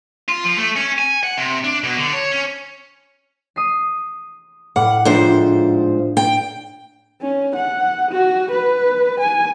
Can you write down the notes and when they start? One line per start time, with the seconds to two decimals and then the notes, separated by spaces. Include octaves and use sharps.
0.29 F4
0.45 F3
0.58 A3
0.76 C#4
0.99 G#5
1.23 F#5
1.37 C3
1.64 D4
1.83 B2
1.98 D3
2.13 C#5
2.31 C#4
3.56 D#6 C7
4.76 A2 F#5 D6 F6
5.05 G#2 F3 D4 C5 E5
6.17 G5
7.21 C#4
7.55 F#5
8.11 F#4
8.51 B4
9.20 G#5